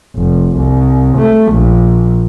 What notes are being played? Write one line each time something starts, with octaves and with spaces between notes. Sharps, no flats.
F1
C2
A3
A#1